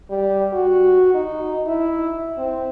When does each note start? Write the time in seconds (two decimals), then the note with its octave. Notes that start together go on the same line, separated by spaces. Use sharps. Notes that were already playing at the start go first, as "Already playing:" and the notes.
0.10 G3
0.53 F#4
1.14 D#4
1.67 E4
2.38 C4